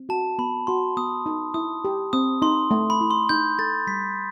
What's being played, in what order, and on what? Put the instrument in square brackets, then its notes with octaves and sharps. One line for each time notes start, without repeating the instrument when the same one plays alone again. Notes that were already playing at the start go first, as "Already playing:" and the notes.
Already playing: [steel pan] C4
[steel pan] F#4 [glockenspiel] A5
[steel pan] B3 [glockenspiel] B5
[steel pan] F#4 [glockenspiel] C6
[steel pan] B3 [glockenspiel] D#6
[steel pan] D#4
[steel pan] E4 [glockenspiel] D#6
[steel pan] G4
[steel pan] C4 [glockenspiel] D#6
[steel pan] D#4 [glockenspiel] C6
[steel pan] A3
[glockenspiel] B5
[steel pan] E4
[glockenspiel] C6
[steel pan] D#4 [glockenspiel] G6
[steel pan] A4 [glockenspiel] A6
[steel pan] G3 [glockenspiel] B6